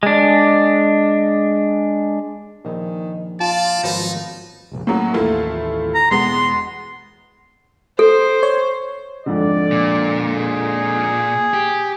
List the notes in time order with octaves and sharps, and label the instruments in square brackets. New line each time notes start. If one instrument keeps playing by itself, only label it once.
[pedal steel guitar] G#3 D4
[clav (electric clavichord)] A#1 [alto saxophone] D#3
[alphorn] F4 [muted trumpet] D5 [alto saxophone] A5
[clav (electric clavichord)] G#1 F3 B4 [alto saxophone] F#3 [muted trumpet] D#4
[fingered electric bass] F1 A#1
[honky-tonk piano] A2 F#3 [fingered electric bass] A#3 C#4
[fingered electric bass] A1 D#2 [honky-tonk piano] A3 E4 F4
[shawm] A#5
[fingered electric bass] E1 [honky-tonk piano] G#3 B3 [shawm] C6
[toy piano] A4 [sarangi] C5
[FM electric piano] C#5
[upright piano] F2 G#2 D3 [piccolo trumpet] D5
[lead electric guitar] A#2
[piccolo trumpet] G#4
[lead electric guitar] G4